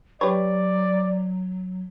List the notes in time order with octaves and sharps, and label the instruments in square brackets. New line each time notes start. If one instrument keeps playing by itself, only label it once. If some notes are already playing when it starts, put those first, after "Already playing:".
[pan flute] F#3 [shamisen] G4 B4 C#5 [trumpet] D5